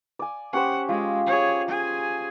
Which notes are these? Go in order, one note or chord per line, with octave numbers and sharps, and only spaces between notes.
D5 G#5
C#4 G4 C5 F#5
G#3 F4
G#4 C#5
G#4 G#5